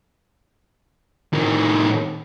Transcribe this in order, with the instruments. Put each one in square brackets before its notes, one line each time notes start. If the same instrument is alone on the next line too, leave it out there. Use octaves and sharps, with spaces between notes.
[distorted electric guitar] A2 D#3